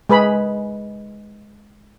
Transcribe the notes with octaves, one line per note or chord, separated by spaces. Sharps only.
G#3 G#4 B4 B5